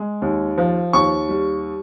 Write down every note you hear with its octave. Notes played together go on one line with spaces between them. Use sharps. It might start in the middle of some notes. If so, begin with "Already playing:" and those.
Already playing: G#3
D#2
F3
D#2 C#6
G3